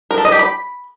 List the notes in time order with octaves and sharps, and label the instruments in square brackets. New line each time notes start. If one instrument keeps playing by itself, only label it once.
[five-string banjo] A#4
A4
D#5
G4
B5